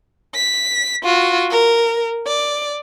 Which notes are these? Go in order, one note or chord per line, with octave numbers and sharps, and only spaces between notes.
B6
F4 F#4
A#4
D5